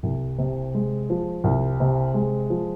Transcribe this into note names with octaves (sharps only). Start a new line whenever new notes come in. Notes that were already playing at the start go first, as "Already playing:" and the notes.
C2
C3
G#3
F3
C2
C3
G#3
F3